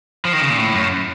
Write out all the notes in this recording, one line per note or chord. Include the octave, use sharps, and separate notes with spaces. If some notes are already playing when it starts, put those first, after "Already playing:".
F3
D#3
C#3
A#2
A2
F#2